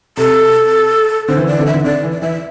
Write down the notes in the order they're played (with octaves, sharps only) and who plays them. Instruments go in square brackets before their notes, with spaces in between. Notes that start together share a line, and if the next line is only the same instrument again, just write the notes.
[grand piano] C3 [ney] A4
[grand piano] D3 [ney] C5
[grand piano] E3
D3
[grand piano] E3 [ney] D5
[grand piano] D3
[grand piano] E3 [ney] E5
[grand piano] D3
[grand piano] D3 [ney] D5
[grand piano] E3
[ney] D5
[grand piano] E3 [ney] E5